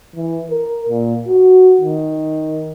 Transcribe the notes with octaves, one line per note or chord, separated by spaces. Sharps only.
E3
A#4
A#2
F#4
D#3